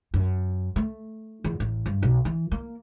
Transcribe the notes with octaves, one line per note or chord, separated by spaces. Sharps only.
F#2
A3
E2
A1
G2
B1
E3
A#3